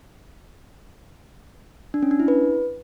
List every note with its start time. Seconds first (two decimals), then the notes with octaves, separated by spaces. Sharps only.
1.94 D4
2.03 C#4
2.11 D4
2.20 E4
2.28 B4